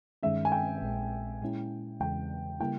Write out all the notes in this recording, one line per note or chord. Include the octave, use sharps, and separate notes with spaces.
G2 D#3 G#3 C#4 E5
G#5
G5
A#1 A#2 G#3
A#2 G#3 C#4 E4
E2 C#3 E3 G#3 G5
C#3 G3 A#3 E4 G5